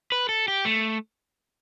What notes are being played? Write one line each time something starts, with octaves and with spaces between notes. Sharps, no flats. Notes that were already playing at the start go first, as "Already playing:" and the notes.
B4
A4
G4
A3